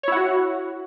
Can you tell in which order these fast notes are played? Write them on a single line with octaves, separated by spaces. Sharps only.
C#5 E4 F#5 F#4